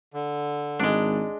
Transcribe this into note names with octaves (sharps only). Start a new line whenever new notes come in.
D3
G#1 G#3 D4